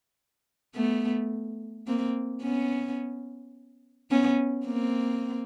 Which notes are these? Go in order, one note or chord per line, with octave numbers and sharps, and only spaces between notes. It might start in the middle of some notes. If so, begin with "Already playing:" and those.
A3 B3
A#3 C4
B3 C#4
B3 C#4
A#3 C4